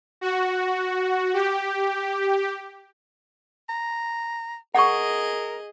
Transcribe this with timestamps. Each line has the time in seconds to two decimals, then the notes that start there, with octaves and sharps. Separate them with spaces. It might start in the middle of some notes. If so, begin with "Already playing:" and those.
0.21 F#4
1.34 G4
3.69 A#5
4.75 G#4 A#4 D#5 F#5 C#6